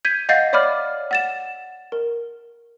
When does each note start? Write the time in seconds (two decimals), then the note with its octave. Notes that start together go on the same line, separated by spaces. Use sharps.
0.05 G6 G#6 B6 D#7
0.29 D#5 F5 F#5 G6 A6 C7
0.53 C#5 D5 B5 D6 F6
1.11 F#5 A6 E7
1.92 A#4